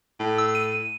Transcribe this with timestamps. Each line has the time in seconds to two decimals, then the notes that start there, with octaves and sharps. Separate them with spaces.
0.19 A2
0.38 E6
0.55 D#7